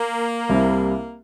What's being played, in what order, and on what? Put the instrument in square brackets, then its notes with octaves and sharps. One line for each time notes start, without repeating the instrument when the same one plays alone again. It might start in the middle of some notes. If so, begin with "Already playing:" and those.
Already playing: [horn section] A#3
[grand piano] C2 C3 G3 C4 E4